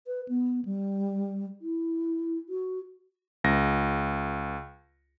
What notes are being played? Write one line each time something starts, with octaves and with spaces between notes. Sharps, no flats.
B4
B3
G3
E4
F#4
C#2 A#6